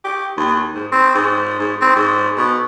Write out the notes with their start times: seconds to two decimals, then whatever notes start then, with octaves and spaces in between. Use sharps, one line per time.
0.04 G4
0.37 D#2
0.75 G#2
0.92 C4
1.15 G#2
1.59 G#2
1.81 C4
1.96 G#2
2.37 B2